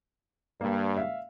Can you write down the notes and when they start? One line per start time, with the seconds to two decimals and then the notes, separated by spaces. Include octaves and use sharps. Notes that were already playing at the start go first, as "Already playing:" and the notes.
0.61 G2 A#3
0.97 E5 F5